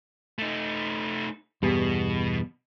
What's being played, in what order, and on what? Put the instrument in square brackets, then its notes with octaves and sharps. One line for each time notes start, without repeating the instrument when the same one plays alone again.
[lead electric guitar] A3 D#4
[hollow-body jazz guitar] E2 G2 [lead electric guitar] B2